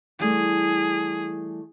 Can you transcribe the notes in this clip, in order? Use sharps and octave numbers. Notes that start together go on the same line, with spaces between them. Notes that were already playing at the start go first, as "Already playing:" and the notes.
E3 G3 A3 G#4